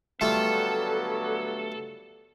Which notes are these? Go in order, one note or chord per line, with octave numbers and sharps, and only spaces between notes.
D3 F#3 G3 A3 B3 F4 A4